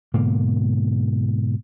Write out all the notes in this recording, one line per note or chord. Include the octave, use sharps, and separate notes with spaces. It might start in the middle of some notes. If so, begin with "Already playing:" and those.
G#2 B2 D3 A#3